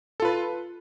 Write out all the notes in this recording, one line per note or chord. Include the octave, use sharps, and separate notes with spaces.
F4 A4 B4